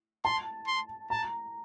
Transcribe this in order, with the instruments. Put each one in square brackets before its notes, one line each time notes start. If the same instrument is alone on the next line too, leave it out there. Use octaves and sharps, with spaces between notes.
[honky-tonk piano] A5 [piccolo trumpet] C6
[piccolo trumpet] C6
[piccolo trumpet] A5 [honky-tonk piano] A#5